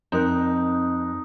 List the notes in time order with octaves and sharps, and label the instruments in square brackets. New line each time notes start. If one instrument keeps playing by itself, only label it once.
[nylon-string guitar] F2 A#4 [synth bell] C4 F#6 [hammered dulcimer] D#4